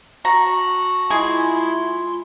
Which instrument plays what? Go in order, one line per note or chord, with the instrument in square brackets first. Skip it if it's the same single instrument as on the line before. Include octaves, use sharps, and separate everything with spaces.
[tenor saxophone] F#4 [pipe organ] A5 [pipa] A#5
[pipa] G#3 G#4 [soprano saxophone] E4 [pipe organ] F4 C6